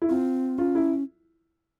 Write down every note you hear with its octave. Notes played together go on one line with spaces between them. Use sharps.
E4
C4 F4
C#4 F4
E4